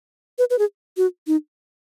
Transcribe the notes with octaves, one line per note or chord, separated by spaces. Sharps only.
B4
B4
G#4
F#4
D#4